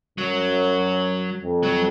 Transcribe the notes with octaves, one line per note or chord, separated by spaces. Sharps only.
F#2 F#3
F2
F#3